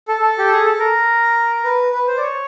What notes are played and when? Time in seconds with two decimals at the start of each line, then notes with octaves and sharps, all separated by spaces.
0.08 A4
0.21 A4
0.39 G4
0.52 G#4
0.65 A4
0.79 A#4
1.64 B4
1.92 B4
2.08 C5
2.18 D5
2.21 C#5